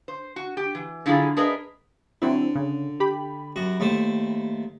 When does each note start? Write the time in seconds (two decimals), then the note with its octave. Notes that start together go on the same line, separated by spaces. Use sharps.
0.08 C5
0.36 F#4
0.57 G4
0.75 E3
1.06 D3 F#3 E4 F4 G4 G#4
1.37 D4 G#4 A#4 B4 D#5 E5
2.22 D3 F#3 C4 E4
2.55 C#3
3.00 G4 B5
3.56 F#2 F#4
3.80 D#2 A3 C5